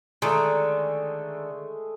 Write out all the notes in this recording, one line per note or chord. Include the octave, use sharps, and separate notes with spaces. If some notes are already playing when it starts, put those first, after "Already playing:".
D3 D#3 G#3 A3